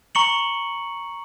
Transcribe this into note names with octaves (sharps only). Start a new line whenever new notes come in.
A#5 C#6 C#7 F#7